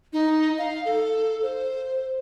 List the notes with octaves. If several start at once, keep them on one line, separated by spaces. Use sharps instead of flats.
D#4
F5
A4
C5